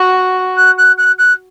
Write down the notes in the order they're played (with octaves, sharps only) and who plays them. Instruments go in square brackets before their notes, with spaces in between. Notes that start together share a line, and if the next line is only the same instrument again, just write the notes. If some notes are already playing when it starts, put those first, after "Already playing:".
Already playing: [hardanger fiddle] F#4
[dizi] F#6
F#6
F#6
F#6